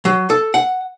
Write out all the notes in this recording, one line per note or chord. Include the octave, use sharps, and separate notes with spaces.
F#3
A4
F#5